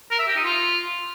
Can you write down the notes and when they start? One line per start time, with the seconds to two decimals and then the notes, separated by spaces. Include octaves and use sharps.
0.11 A#4
0.19 E5
0.28 G4
0.36 D#4
0.45 F4